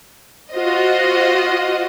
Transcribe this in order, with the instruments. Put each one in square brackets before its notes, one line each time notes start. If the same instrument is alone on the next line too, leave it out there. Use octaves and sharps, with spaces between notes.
[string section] F4 F#4 C5 D#5